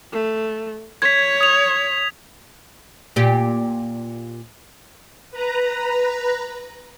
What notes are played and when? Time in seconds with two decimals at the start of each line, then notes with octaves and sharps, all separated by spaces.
0.13 A3
1.02 C#5 G#6 B6
1.41 D#6 F7
3.16 A#2 G4
5.31 B4 A#5